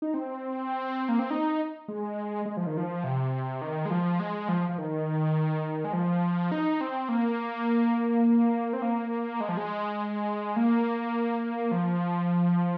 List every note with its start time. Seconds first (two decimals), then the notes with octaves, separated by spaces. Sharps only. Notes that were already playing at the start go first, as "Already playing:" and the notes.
0.02 D#4
0.14 C4
1.09 A#3
1.19 C4
1.30 D#4
1.88 G#3
2.45 G#3
2.57 F3
2.67 D#3
2.77 F3
3.04 C3
3.62 D#3
3.85 G#3
3.90 F3
4.20 G#3
4.48 F3
4.69 F3
4.78 D#3
5.84 G#3
5.93 F3
6.52 D#4
6.81 C4
7.09 A#3
8.73 C4
8.82 A#3
9.41 G#3
9.49 F3
9.57 G#3
10.56 A#3
11.72 F3